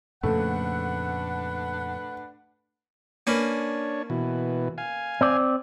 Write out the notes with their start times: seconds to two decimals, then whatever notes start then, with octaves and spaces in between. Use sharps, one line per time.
0.23 F2 A#2 C#3 A3 D4 B4 F#5
3.27 A#3 C#4 D4 B4 C#5
4.10 B2 E3
4.78 F5 G#5
5.21 C4 D5